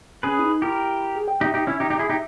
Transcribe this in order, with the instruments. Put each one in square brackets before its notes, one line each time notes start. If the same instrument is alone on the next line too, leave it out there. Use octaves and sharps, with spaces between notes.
[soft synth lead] C#4 [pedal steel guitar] G#4 B4
[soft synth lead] E4
D#4
[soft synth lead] E4 [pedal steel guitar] G4 A#4
[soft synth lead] G#4
G5
[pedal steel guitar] D#4 G4 [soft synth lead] E5
[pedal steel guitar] D#4 G4
C#4 E4
D#4 G4
D#4 G4
E4 G#4
D#4 G4